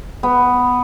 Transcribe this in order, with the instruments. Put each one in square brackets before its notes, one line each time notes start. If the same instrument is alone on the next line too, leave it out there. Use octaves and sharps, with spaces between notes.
[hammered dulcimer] B3